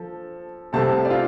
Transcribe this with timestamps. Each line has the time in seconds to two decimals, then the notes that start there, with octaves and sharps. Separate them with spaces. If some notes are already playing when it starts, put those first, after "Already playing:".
Already playing: F3 A4
0.73 C2 C3 A3 C4 A4 A5
1.05 D5
1.10 F4 F5